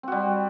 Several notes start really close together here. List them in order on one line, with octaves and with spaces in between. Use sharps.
C4 F#4 G3